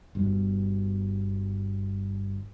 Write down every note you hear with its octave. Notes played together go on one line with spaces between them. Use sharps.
G1 G2 B2